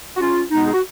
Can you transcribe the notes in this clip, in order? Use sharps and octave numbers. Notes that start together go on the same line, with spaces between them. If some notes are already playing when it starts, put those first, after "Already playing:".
F#4
C#4 F4
B2 G#3 B3 D#4
G#4
F#4